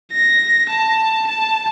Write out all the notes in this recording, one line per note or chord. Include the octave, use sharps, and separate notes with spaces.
A#6
A5
A5